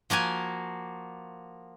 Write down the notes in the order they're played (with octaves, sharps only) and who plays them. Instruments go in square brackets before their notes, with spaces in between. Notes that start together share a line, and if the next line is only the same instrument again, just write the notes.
[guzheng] F3 A#3 F#4 G#5